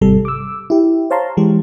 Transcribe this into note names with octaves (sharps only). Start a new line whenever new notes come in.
G#1 C3 G3 A4
D6 E6
E4 G4
C5 C#5 F5 A5 A#5 C6
E3 G#3 G4